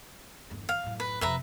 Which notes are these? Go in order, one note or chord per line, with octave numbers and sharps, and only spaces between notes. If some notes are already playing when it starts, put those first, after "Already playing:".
G1 E2
F5
F#2 A2
B4
F2 C3 B4 E5 A#5